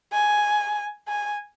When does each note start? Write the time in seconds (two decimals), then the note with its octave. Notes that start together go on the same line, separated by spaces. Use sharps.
0.13 G#5
1.08 G#5